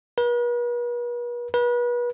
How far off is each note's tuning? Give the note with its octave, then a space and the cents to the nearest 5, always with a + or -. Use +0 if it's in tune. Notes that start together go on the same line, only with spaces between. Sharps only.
B4 -45
B4 -35